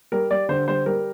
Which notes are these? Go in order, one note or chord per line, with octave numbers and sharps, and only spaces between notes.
G3 A#4
G3 D5
D3 C5
G3 C5
G3 A#4